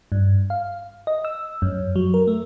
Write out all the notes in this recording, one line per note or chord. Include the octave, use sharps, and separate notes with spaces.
G2
F5
D#5
E6
F#2
F#3
A#4
A3